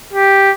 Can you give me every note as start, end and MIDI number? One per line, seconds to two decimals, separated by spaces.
0.13 0.51 67